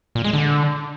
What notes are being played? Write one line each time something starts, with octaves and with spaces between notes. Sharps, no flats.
A#2
G#3
D3